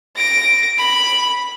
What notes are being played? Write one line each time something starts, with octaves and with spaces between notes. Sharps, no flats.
A#6 D7
B5